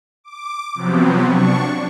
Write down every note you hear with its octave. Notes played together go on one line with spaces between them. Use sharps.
D6
C3 F3 F#3 B3 C4
D4 C#6